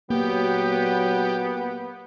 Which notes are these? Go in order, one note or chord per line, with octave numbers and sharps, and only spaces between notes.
A#2 F#3 A#3 B3 G4